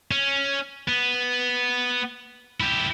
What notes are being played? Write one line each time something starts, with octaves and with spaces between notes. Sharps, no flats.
C#4
B3
E4 G4